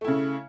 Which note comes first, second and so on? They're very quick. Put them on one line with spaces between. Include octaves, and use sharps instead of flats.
A3 E4 C#3